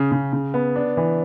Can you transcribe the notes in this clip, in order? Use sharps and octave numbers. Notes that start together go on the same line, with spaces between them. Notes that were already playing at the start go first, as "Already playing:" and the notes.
Already playing: C#3
C#3
C#3
B3
D4
E3